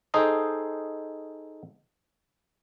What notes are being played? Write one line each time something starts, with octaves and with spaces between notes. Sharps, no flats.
D#4 G#4 A4 C5 D#5 G5